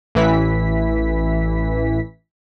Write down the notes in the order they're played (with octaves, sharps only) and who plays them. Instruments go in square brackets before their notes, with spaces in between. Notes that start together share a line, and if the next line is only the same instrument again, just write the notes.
[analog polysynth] A1 E3 E4 B6